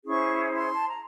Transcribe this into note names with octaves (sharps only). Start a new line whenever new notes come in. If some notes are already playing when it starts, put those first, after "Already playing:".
C#4 E4 G#4 C5 C#6
C6
A5
A#5